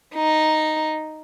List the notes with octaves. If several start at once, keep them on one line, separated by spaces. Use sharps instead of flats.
D#4